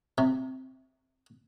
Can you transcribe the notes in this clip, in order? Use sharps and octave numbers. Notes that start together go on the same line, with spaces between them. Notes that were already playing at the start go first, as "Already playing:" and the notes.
C3